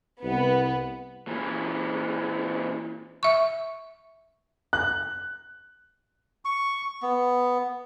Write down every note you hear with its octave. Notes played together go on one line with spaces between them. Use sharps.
C2 B3
A#2 E3
E5 C#6
F#6
C#6
B3